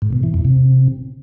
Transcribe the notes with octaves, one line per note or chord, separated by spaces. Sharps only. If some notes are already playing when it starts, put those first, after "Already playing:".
G#2
B2
E3
F2
C3